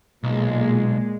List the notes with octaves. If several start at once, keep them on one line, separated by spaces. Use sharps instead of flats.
B1 A#2 G#3